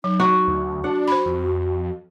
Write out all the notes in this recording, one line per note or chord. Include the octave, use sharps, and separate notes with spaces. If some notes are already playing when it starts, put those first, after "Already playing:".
F#3 D#4
F#4 A#5
D2
D4 F#4 F#5
C5 B5
F2